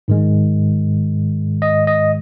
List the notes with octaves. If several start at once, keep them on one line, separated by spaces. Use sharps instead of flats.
G#2 D#3 G#3
D#5
D#5